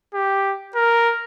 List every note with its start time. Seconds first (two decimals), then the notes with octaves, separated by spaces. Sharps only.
0.15 G4
0.76 A#4